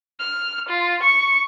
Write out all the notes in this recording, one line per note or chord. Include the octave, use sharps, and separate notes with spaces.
F6
F4
C#6